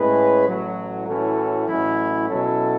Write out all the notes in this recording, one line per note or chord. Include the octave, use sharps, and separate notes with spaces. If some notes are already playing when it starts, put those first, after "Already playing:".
Already playing: A2 G#3 C#4 G#4 B4
A1 A2 F#3 A3
A2 E3 A3 C#4 F#4
A1 A2 F#3 C#4 E4
B2 F#3 C#4 E4 A4